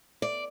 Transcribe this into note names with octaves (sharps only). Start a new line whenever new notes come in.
D5